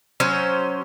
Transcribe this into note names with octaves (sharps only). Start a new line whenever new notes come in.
F#3 C#4 C5